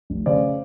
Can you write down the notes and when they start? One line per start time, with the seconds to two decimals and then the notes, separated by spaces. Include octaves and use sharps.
0.10 F1
0.26 C#3 C5 D5